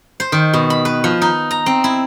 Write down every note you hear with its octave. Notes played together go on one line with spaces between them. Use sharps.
C5
D#3
B2
B5
B4
F3
D#4
A#5
C4
E4